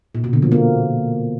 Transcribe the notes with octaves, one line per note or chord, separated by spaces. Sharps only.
A#2
B2
D3
F3
A#3